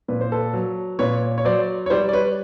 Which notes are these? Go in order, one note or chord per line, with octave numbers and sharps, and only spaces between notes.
A#2 B4
C5
A4 B4
F#3
A#2 B4 C#5
C#5
F#3 C5 D5
C#5
G3 C5 D5
D5
B4 C#5